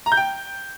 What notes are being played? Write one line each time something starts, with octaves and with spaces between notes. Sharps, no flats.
A#5
G6
G5